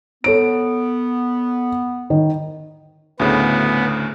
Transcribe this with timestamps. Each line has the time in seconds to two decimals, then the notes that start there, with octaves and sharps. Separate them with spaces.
0.24 B3 A4 C#5 D7
2.10 D#3
3.20 D2 A2 C#3 B3